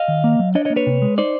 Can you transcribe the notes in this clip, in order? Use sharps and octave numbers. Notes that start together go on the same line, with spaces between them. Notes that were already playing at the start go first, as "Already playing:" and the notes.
Already playing: D#5 F5
D#3
A#3
F#3
D4 C#5 D#5
C#5 D#5
A#3
B4 C#5
C3
G#3
D#4 C5 D5